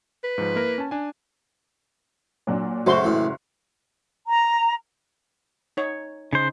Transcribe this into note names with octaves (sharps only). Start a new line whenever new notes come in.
B4
G#2 F3
A#3 E4 A#4
C#4 A5
D4 G#5
A#2 F#3 D4
F#1 F#3 A3 F#4 C5 C6
A2 E3
A#5
D#4 C#5
C#3 D#4 C5